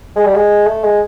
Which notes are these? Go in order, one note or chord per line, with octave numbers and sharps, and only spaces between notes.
G#3
G3
G#3
A3
G#3